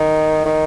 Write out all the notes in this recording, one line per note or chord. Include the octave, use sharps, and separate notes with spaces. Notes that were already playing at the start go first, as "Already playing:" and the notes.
Already playing: D#3
D#3